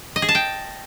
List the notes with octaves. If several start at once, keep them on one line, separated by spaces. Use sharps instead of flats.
D#5
G#4
A5
G5